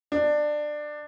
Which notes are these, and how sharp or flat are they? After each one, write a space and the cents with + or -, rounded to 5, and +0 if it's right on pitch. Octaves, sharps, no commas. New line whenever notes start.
D4 +20